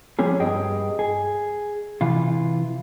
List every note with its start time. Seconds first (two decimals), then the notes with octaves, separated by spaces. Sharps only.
0.19 F3 G3 C4 C#4 G#4
0.40 G2 G4 G#4 D#5 G5
0.99 G#4
2.01 C3 E3 F4